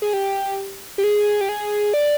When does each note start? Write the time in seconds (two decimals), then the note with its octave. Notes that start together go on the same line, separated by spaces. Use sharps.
0.02 G#4
0.13 G4
0.98 G4
1.04 G#4
1.41 G4
1.49 G#4
1.94 D5